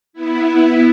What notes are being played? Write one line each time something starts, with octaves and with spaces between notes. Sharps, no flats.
B3 E4